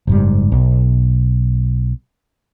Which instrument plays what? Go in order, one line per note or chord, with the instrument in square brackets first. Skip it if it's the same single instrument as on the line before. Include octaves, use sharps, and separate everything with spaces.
[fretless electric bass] F#1 G#2 G3
B1